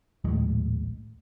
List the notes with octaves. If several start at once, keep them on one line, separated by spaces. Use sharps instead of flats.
A#1 D#2 A2 G#3